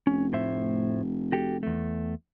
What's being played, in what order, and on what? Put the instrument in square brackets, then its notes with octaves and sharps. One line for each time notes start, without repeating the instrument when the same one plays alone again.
[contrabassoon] F1 [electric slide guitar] C#4
[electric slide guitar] A2 C5 E5
F#4 G4 A4
E2 A3